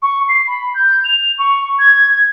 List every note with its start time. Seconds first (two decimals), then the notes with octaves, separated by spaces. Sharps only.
0.02 C#6
0.29 C7
0.47 B5
0.75 G6
1.04 F7
1.38 C#6
1.79 G#6